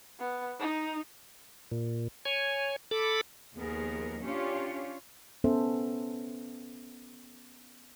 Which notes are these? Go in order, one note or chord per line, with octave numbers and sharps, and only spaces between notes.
B3
D#4
A#2
C#5 G#5
A4 B5 D6
D#2 F3 B3 G#4 A#4
C#4 D4 F4 G4 C#5
B3 C#4 A4 C5 E5